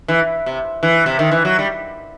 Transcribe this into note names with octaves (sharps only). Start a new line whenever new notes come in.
E3
C3
E3
C3
D#3
E3
F#3
G3